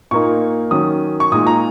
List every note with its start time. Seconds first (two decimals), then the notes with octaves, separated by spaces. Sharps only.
0.11 A#2 A#3 D#4 C#6
0.71 D#3 F#3 C#4 D#6
1.20 C#6
1.32 A#2 G#3 D#4 D#6
1.47 A#5